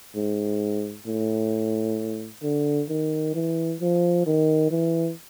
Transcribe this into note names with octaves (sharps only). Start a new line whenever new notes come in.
G#2
A2
D3
D#3
E3
F3
D#3
E3